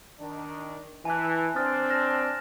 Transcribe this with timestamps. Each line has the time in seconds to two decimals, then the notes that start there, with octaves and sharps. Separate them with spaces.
0.20 D#3 D4
1.05 E3 G#5 A5 F#6
1.56 C4 D4 D#6 F6 A6
1.90 F6 A#6 E7